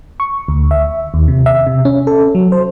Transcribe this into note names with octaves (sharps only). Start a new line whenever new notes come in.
C#6
D2
E5
D#2
C3
E5
C3
C#4
A4
F#3
C5